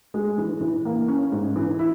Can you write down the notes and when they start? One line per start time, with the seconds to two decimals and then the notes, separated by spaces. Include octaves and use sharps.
0.14 G#3
0.38 E3
0.61 E3
0.85 A#3
1.08 C#4
1.32 G#2
1.56 E3
1.79 E4